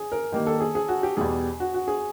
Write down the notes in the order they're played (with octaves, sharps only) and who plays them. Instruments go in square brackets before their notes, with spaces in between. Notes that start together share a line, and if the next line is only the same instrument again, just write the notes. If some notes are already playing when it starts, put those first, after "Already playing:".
Already playing: [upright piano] G#4
A#4
[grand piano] D#3 G3 A#3
[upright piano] A4
G#4
G#4
F#4
G4
[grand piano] E2 B2 G3 [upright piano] G#4
[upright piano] F#4
F#4
G#4